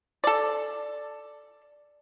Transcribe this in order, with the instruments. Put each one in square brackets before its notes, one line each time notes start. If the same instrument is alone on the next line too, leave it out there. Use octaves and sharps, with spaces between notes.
[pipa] A4 D5